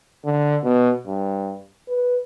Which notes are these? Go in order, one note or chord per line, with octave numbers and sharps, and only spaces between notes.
D3
B2
G2
B4